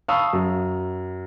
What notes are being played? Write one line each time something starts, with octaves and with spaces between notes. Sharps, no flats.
F5 A5 B5 C#6 D#6 E6
F#2